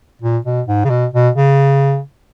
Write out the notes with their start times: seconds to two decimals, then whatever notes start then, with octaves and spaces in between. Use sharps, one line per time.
0.22 A#2
0.45 B2
0.67 G#2
0.85 C#3
0.90 B2
1.13 B2
1.36 C#3